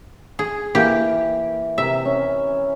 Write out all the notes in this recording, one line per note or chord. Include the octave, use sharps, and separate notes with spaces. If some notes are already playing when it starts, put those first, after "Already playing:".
G#4
E3 A#3 G4
C3 A#4 E5
C#4